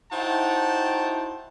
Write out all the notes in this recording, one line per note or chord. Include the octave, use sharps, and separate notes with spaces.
D#4 E4 F#4 C5 G5 A5